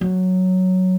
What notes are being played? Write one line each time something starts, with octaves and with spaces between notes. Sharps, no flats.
F#3